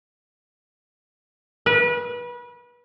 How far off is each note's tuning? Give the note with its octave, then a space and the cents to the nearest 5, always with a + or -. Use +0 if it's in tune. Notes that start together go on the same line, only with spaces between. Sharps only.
B4 -30